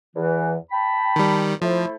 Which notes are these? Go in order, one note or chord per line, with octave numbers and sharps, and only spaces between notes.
E2 E3
G5 A5 B5
D#3 G3
F3 A3 E4 C5